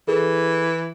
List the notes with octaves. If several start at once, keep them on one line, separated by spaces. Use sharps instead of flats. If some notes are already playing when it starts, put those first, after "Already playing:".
E3 G#4 A4